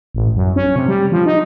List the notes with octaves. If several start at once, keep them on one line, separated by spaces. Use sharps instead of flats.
A1
F#2
C#4
C3
G3
F3
D#4